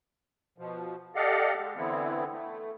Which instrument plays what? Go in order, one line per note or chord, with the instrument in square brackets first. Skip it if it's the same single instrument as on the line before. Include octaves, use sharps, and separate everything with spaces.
[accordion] B2 F3
G4 A4 D5 D#5 F5 F#5
G#3
D3 E3 B3 C4 E4
A3